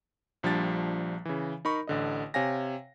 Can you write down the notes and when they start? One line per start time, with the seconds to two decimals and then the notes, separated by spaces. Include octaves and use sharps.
0.43 A#1 F3 G3 D4 A6
1.25 C#3 E3
1.65 D#4 A#4 B5 C#6
1.87 A1 D3 D#5
2.34 C3 C#5 F5 G#5 A#6